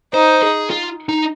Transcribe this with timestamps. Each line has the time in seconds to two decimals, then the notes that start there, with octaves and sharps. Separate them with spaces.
0.14 D#4 C5
0.43 G#4
0.70 F4
1.09 D#4